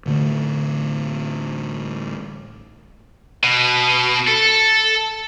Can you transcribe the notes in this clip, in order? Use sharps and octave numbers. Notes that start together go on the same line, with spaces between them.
A1 D3 D#3 A3
B2
A4